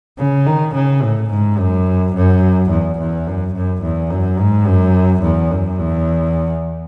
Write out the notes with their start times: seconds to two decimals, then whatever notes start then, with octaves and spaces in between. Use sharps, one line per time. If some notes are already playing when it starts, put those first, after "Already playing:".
0.18 C#3
0.46 D#3
0.74 C#3
1.02 A2
1.30 G#2
1.58 F#2
2.15 F#2
2.70 E2
2.99 E2
3.26 F#2
3.54 F#2
3.82 E2
4.10 F#2
4.39 G#2
4.66 F#2
5.22 E2
5.51 F#2
5.78 E2